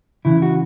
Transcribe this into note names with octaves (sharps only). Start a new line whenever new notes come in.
C#3 E3 E4
F#4